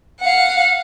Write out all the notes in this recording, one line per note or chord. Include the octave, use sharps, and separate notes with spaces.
F5 F#5